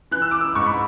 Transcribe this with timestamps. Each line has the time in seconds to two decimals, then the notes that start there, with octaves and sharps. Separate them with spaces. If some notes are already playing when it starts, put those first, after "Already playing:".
0.11 E3 F#6
0.22 E6
0.31 D6
0.41 E6
0.55 G#2 C#6
0.66 B5